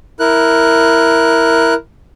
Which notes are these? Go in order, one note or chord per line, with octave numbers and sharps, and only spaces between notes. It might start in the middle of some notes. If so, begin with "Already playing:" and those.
E4 A#4 F#6